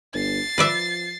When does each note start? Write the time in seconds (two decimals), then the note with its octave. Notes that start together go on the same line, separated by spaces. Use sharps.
0.14 G1 A6 C7
0.58 F3 B4 D5 E5